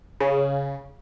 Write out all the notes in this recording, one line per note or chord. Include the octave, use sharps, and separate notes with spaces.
C#3